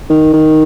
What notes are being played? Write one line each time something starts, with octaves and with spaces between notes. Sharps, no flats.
D#3
D#3